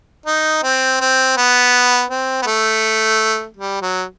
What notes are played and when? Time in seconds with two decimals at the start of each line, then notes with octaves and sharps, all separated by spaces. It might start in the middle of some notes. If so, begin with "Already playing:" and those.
0.26 D#4
0.63 C4
1.01 C4
1.37 B3
2.11 C4
2.42 B3
2.46 A3
3.57 G3
3.82 F#3